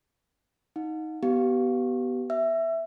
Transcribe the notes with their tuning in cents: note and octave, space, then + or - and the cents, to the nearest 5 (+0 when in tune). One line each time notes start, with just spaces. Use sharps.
D#4 +15 F#5 -40
B3 +0 G4 -30 F5 +0
E5 +0 E6 +30